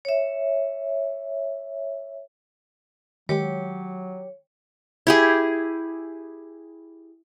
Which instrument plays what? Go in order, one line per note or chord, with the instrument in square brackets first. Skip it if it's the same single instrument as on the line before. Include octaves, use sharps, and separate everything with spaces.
[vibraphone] C#5 E5
[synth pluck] D#3 G#3 [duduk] F#3 [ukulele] G4 [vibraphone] C#5
[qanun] E4 G4 G#4